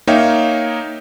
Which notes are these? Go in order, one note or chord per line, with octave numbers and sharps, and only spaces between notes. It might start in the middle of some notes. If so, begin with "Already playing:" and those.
A#3 D#4 C#5 E5 F5 G5